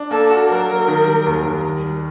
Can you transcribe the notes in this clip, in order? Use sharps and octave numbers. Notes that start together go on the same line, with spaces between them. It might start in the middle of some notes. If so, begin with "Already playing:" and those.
Already playing: D4
A#3 A4
F#4
F#3 A#4
F#3
D#3
G3
D#2
D#2
D#3
G3